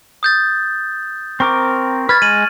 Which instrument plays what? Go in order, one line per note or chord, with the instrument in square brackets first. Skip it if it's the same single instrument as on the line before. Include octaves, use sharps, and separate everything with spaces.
[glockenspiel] D#6 G6 A6
[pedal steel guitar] C4 A#4 D6 [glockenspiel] C#6
[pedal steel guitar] B4 [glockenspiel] F6 G#6 A6
[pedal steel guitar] G#3 [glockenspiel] D#7 F#7